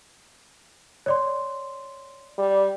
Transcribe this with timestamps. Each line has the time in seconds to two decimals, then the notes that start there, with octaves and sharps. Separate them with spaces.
1.06 C#5 D5 C6
2.38 G3